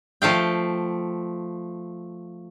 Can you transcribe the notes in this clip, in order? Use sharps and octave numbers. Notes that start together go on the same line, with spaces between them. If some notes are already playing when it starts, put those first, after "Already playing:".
F3 A3 F5 G5